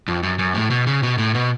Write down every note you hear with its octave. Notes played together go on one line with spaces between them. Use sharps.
F2
F#2
F#2
A2
B2
C#3
B2
A2
B2